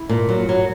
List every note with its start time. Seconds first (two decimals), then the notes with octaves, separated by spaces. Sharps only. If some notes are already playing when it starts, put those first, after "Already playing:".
Already playing: E4
0.09 A#2
0.29 F#3
0.49 F#3